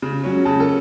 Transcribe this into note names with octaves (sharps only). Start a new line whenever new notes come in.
C#3
F#3 C#4
C#3 A5
A4